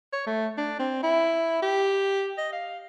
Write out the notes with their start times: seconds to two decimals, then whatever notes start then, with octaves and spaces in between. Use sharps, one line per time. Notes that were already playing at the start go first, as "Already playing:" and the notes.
0.13 C#5
0.27 A3
0.58 D4
0.79 C4
1.03 E4
1.62 G4
2.38 D#5
2.52 F5